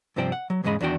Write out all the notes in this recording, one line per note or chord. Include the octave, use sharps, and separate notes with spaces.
G2 C3 F3 C5 D5 G5
F#5
F#3
E2 G#2 C#3 G#3 D#5 B5
E2 D#3 D4 F#4 G5